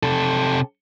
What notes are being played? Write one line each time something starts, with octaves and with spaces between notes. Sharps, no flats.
C3 A4